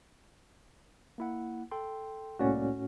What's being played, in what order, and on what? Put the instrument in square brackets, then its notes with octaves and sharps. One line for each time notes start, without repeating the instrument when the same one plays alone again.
[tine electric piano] A#3 E4 F#5
A4 G5 C6
[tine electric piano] C2 A#3 D5 [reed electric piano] A2 C#4 F#4